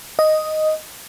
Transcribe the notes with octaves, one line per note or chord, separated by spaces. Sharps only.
D#5